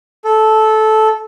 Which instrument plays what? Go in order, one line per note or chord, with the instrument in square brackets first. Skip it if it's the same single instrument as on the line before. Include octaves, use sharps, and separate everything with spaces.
[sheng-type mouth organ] A4